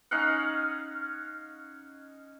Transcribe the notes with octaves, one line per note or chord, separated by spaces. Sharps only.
C#4 D#4 F5 F#5